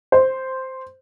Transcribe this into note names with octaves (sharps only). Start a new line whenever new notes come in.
C5